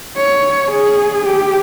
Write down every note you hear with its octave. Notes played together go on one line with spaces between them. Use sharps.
C#5
G#4
G4